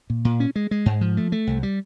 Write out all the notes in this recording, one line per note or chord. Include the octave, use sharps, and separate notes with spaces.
A#2
A#2
C#4
G#3
G#3
G#2
F3
A3
A3
C2
G3